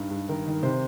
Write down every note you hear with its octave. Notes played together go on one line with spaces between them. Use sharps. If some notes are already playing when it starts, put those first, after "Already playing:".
Already playing: G2 D#4
G2
D#3 A#4
D#3
C3 C5